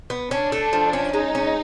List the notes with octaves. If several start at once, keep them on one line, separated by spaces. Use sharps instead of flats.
B3
C#4 D4
A3
F3
C#4
G#3 D#4
C#4